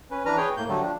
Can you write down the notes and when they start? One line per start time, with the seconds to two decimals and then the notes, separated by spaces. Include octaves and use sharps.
0.11 C#4 B4
0.26 E3 D4 B4 A#5 F6
0.37 G#4 B4 C#5 G5
0.57 A2 A#3 G6
0.68 D3 F#3 G3 A3
0.82 F3 D4